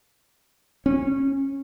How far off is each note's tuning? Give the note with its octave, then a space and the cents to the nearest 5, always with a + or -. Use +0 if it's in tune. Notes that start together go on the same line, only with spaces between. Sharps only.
C#4 -15